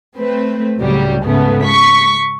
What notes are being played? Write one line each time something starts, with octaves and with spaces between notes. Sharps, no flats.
A3 C4 B4
C#2 A2 C#3 F#3 G3
G#2 C#3 A3 B3
C#6 B6